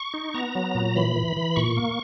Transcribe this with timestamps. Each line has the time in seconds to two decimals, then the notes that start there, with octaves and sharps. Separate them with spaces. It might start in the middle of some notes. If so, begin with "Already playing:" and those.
Already playing: C#6
0.14 D#4
0.34 B3 A#5
0.55 F#3
0.75 A#2
0.96 E3 B5
1.16 E3
1.37 E3
1.56 A#2 C#6
1.77 A#3